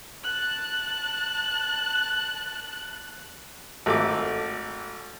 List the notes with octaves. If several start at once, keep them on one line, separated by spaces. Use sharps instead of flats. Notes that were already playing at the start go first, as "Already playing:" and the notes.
A5 F#6
G#1 A3 D6